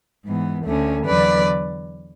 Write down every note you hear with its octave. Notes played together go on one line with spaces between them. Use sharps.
G#2 E3 B3
D2 D3 A3 C#4
E2 D3 F#3 B4 D5